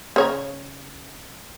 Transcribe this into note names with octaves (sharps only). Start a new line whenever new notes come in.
C#3 C#5 A#5